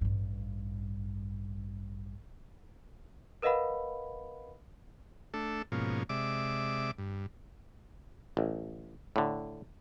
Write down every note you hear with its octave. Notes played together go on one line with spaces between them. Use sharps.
A1 G2
A#4 B4 D#5 F5 F#5 B5
A3 D4 A4
G#2 B2 F3 A#3 C#4
C3 G#3 D5 E5 D6
G2
A1
A2 D3